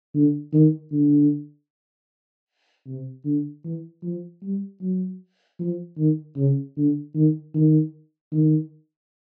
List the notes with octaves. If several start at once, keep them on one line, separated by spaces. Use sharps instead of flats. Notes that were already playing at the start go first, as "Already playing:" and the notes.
D3
D#3
D3
C3
D3
E3
F3
G3
F#3
F3
D#3
C#3
D3
D#3
D#3
D#3